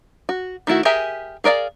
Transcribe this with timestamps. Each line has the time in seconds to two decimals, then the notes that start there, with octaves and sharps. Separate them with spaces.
0.29 F#4
0.67 D#3 A3 E4 F#4
0.85 G4 G#4 A#4 E5 G#5
1.44 G#4 A#4 D5 E5 F5